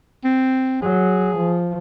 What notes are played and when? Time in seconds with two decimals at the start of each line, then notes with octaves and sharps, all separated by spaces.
0.24 C4
0.82 F#3 G#4
1.36 F3